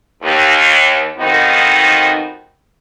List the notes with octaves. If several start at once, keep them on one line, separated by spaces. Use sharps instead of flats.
D#2
F2 D#3 B3 C4 D#4 F#4